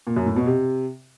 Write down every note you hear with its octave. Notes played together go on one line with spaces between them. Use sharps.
A#2
F#2
A2
B2
C3